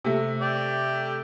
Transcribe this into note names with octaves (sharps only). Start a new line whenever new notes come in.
C3 A3
G4 D5